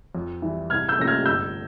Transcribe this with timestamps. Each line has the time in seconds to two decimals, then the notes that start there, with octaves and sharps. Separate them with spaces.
0.15 F2
0.42 E3 G3
0.70 C2 F6 G#6
0.89 E6 G6
0.98 C3 F3 A#3 C#4 A#6
1.07 F6 G#6
1.26 G1 E6 G6